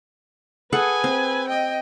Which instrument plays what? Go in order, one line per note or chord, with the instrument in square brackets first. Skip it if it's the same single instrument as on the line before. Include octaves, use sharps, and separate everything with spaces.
[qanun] G#4 A4 F#5 [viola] B4 G#5
[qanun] C4
[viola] D#5 G5